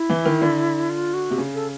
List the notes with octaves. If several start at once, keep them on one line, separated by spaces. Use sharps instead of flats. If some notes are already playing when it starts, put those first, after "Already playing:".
Already playing: E4
E3
D#3
D3
F4
F#4
C3
C#3
A4